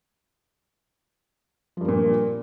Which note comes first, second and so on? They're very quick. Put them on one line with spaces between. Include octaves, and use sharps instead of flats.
F3 G2 A#3 A#2